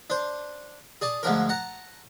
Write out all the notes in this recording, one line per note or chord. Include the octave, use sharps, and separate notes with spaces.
D4 C5
G#4 D5 A5
D2 G#2 F3 D4 A#4
F#5 A5 A#5